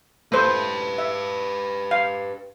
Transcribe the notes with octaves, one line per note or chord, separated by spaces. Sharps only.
A3 G4 B4 C5
E5
F5